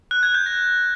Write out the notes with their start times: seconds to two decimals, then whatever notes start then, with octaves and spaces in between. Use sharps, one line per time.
0.11 F#6
0.23 G#6
0.34 G6
0.46 A#6